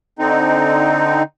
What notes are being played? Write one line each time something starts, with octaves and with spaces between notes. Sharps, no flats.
D3 C4 D#4